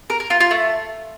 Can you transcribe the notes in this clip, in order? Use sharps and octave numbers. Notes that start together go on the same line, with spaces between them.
A#4
A#4
F4
F4
A3